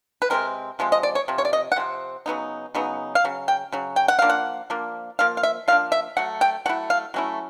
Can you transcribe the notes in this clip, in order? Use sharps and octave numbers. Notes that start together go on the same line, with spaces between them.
B4
C3 F3 G#3 C4 A#4
C3 F3 G#3 C4
D#5
D5
C#5
C3 F3
C#5
D5
D#5
F#5
C3 F3 C4
C#3 F#3 B3 D#4
C#3 F#3 B3 D#4
F5
C#3 F#3
G5
C#3 F#3
G5
F#5
F3 A#3 D4 F5
F#5
F3 A#3 D4
F3 A#3 F5
F5
E5
F3 A#3 D4 F5
E5
F#3 A3 F#5
G5
F#3 A3 E4 F#5
F5
F#3 A3 C#4 E4